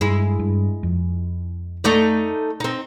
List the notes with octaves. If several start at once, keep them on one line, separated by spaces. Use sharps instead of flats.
G2 G#3 E4
G2
F2
A3 D#4 D5
C4 D#4